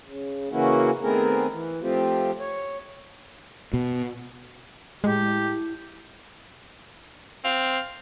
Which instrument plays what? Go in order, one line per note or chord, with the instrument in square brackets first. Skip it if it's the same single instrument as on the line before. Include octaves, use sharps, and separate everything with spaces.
[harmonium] C#3
C#3 E3 A#3 C#4 E4 F#4
D#3 A3 B3 C4 G#4 A#4
E3
F3 A3 C4 F4 G4
C#5
[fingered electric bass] B2
[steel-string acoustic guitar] A2 [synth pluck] G#3 [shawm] G4
[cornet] C4 [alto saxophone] F5